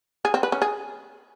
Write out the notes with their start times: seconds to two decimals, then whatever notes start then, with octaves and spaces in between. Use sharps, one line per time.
0.25 G#4
0.34 C4
0.43 B4
0.52 C#4
0.62 G#4